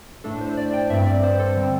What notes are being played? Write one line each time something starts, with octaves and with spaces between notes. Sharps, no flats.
A2 A3 D4 A4
C5
D5
G5
G2 G3 C4 E5
D5
C5
A4
D3 G3 C4